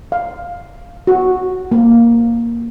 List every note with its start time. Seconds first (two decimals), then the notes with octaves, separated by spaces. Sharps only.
0.12 F5
1.07 F#4
1.72 A#3